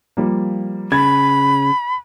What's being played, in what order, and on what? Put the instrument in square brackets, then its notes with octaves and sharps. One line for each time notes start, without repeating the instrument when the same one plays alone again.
[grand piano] F3 G3 A#3
[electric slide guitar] C#3 [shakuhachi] B5 [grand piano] G#6 A6